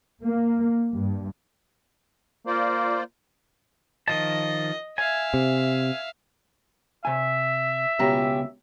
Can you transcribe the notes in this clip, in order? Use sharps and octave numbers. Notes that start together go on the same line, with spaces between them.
A#3
G2
A#3 F4 C5 D5
D#3 F3 D#5 A5
E5 F5 G#5
C3
C3 E5 G#5
C#2 B2 C#4 F4 G4 A#5